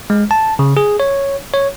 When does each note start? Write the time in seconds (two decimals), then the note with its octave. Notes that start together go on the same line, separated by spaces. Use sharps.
0.10 G#3
0.31 A5
0.59 C#3
0.77 G#4
1.00 C#5
1.54 C#5